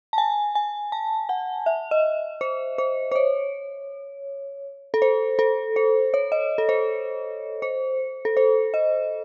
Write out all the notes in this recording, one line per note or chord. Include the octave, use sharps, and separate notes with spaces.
A5
G#5
G#5
A5
F#5
E5
D#5
C5
C5
C5
C#5
A4
C5
A4
C5
C#5
D#5
A4
C5
C5
A4
C5
D#5